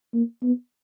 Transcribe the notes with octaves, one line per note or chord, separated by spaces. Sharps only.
A#3
B3